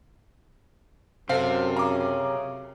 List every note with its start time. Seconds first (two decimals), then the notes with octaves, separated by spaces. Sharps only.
1.29 F#2 C3 A4 C5 F5
1.76 C#3 A#5 D6